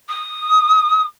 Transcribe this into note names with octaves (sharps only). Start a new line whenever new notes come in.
D#6